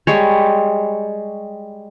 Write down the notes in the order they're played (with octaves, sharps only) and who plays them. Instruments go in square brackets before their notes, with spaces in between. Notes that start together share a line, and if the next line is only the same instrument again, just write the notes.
[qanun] G3 G#3 C#5